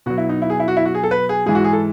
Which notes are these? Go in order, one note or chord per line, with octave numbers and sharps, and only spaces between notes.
B2 F#3 F#4
E4
D#4
E4
G#4
E4
F#4
E4
F#4
G#4
A4
B4
G#4
G#2 E3 G#3 G#4
F#4
G#4
A4